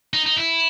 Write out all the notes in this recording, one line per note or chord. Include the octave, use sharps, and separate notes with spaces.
D#4
D#4
E4